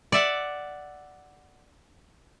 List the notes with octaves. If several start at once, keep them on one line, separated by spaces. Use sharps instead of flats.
D5 E5 F#5